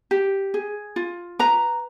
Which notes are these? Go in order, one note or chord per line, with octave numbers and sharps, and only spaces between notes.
G4
G#4
F4
B4 A#5